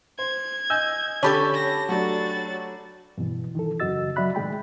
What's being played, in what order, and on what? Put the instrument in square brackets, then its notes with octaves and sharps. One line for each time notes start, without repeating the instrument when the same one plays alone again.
[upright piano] C5 [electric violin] G#6
[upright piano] D#5 G#5 [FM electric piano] E6 G6
[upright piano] D3 [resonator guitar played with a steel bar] C#4 G4 A4 [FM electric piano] C#5 A5 B5
[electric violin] A#6
[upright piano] F#3 A3 D4 [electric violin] F#4 A6
[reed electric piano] G2 B2 E3
D#3 E3 A4
F#2 C#3 F#4 D#5 E6 A6
F#3 F#4 D5 E5 B5 F#6
A2 D#3 G#3 G5 B5